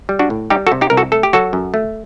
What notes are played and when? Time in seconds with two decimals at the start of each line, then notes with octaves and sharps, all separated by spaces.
0.09 G3
0.19 D4 F#4
0.30 A2
0.50 G3 D#4 G4
0.67 F#4 A4
0.72 C3
0.81 D#4 G4
0.90 C2 A#4
0.97 F#4 A4
1.12 A3 A4
1.23 G4
1.33 F#3 F#4 A4
1.53 F#2
1.74 A3